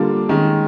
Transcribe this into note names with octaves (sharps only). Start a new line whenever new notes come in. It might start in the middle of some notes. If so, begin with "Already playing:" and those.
Already playing: D3 G3 A#3 D4 F4
D#3 G#3 C#4